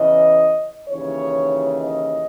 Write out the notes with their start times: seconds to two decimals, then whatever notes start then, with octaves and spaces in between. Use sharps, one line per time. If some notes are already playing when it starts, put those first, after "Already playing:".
Already playing: E2 C#3 E3 D#5
0.88 D#2 C#3 E3 C#5
1.77 D#5